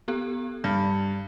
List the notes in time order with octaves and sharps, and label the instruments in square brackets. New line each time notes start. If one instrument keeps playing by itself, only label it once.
[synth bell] B3 G4 A4
[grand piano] G2 [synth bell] D5